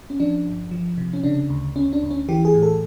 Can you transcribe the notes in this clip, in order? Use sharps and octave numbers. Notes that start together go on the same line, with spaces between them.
C#4
F3 D4
G1
F3
C3
C#4
C#3 D4
D2
D2 C#4
D4
D2
C#4
E3 G4
G#4
A2
A4